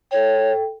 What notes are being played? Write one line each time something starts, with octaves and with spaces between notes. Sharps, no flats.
A4 C#5 G5